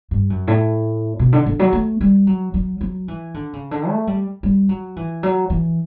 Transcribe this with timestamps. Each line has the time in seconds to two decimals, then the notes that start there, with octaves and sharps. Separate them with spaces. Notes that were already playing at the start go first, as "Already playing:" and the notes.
0.11 G2
0.30 F#2
0.47 A2
1.19 B2
1.33 D3
1.46 D3
1.59 F#3
1.73 A3
2.01 G3
2.27 F#3
2.54 F#3
2.81 F#3
3.08 E3
3.34 D3
3.53 C#3
3.71 D3
3.89 A3
4.07 G3
4.43 G3
4.69 F#3
4.96 E3
5.23 F#3
5.50 E3